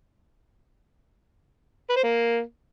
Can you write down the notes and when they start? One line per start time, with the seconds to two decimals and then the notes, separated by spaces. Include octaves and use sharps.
1.90 B4
1.97 C5
2.04 A#3